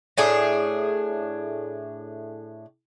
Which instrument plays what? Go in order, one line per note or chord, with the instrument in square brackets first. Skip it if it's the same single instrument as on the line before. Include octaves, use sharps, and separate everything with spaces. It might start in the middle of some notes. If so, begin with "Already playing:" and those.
[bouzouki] A2 D4 G#4